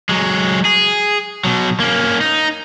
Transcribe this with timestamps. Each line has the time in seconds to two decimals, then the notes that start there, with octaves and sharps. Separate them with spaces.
0.09 F#3 G#3
0.65 G#4
1.44 B2 F#3
1.80 A#3 C#4
2.21 D#4